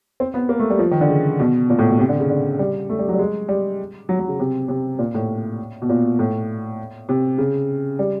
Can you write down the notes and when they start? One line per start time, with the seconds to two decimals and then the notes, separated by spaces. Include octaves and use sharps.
0.20 C4
0.34 B3
0.49 A#3
0.60 A3
0.70 G3
0.79 F3
0.91 D#3
1.01 D3
1.09 C#3
1.40 B2
1.70 A#2
1.79 A2
1.90 B2
1.99 C3
2.09 D3
2.20 C#3
2.30 D3
2.59 G3
2.89 A3
2.99 G3
3.09 F#3
3.14 G3
3.19 G#3
3.49 G3
4.09 F#3
4.19 F#3
4.28 C#3
4.40 C3
4.68 C3
4.99 A#2
5.14 A2
5.82 B2
5.89 A#2
6.19 A2
7.09 C3
7.38 C#3
7.99 G3